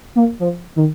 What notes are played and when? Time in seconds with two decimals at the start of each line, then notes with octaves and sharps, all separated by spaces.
0.16 A#3
0.40 F3
0.76 D#3